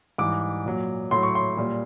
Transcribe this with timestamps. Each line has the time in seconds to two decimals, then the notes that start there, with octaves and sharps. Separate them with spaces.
0.18 G#2 E3 G3 D6
0.65 A#2 F#3
1.11 A2 F#3 C6
1.23 C#6
1.35 C6
1.57 A#2 G3